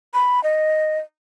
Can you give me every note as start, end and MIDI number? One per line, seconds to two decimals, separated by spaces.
0.14 0.43 83
0.44 0.99 75